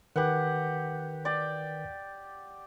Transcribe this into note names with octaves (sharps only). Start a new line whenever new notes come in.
D#3 G4 A#4 B4 F#5
D5 G5